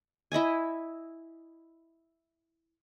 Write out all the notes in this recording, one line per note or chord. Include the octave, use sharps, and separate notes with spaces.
E4 D#5 E5 G#5